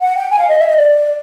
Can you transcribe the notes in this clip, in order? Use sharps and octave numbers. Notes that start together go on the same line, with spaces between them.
F#5
G5
G#5
F5
D#5
E5
D#5
D5